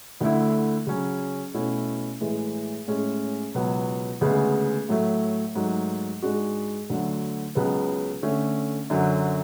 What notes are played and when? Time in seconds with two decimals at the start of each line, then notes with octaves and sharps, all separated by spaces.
0.21 D2 D3 A3 E4
0.87 C#3 F#3 C#4
1.54 B2 A3 C#4 E4
2.21 A2 E3 G#3
2.87 A2 G#3 C#4
3.55 C#2 B2 F#3 B3
4.21 D2 C#3 G#3 B3
4.89 A2 F#3 A3
5.55 G#2 F#3 A3
6.22 G#2 G#3 D4 F#4
6.90 D2 D3 F#3
7.55 C#2 C#3 F#3 B3
8.23 D3 A3 C#4
8.90 F#2 D3 F#3